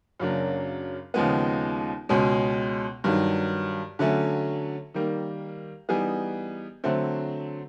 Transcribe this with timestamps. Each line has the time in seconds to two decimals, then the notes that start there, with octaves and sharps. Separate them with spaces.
0.20 F#2 C#3 F#3 A#3 D4
1.14 D#2 C#3 F3 G#3 B3
2.09 C#2 B2 G#3 C#4
3.04 G2 D#3 F#3
3.99 D3 F#3 A3 C#4
4.94 D#3 G3 A#3
5.89 E3 G3 B3 D#4 G#4
6.84 D3 F#3 A3 C4